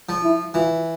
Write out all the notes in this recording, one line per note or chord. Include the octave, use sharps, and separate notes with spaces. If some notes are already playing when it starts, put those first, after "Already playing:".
F3
E4
E3 F4